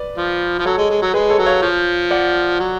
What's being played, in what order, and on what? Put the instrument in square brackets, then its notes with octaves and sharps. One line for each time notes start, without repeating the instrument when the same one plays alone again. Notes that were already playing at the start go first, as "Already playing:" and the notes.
Already playing: [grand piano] B4 D5
[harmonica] F3
F3
[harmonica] F#3 [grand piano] A4 C#5
[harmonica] G#3
G#3
F#3
[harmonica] G#3 [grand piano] G#4 B4
[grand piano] A4 C#5
[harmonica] F#3
[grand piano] C#5 F5
[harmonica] F3
[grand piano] D5 F#5
[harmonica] F#3